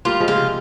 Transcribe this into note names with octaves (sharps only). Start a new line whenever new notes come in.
G3 A#3 F4
F3 G#3
C#3 F4
C3